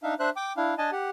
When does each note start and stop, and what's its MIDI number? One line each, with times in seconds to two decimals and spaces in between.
0.03 0.14 62
0.03 0.14 63
0.03 0.14 76
0.03 0.14 77
0.20 0.30 62
0.20 0.30 72
0.20 0.30 76
0.20 0.30 90
0.36 0.53 79
0.36 0.53 86
0.57 0.74 62
0.57 0.74 64
0.57 0.74 77
0.78 0.90 62
0.78 0.90 75
0.78 0.90 80
0.78 0.90 81
0.92 1.10 67
0.92 1.10 78